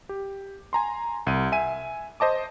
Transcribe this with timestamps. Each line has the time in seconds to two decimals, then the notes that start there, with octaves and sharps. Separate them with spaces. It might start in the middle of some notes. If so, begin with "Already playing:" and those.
0.09 G4
0.73 G#5 A#5 C6
1.27 C2 D#7
1.52 E5 G#5 D#7
2.20 C5 D#5 A5 D6